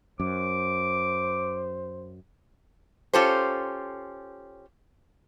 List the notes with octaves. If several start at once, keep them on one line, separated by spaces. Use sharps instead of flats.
F#2 C5 D6
C#4 F4 G4 A4 C5